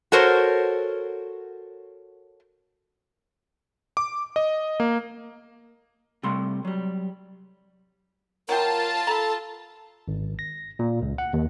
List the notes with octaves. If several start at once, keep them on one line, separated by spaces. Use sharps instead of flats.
F#4 A4 A#4 C5 C#5
D6
D#5
A#3
C3 G3 A3 C6
F#3 G3
F#3 F4 A#4 D#5 G5 A5
A4 A#5 B5
G#1
A#6
A#2
C#2
F#5
D#2